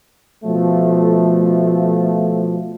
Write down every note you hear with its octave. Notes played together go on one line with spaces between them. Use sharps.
B2 F3 A3